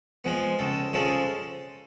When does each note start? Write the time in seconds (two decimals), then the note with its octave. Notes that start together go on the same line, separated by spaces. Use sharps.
0.24 F3 G#3 B3
0.59 C#2 A4
0.93 C#3 F3 G#3 A4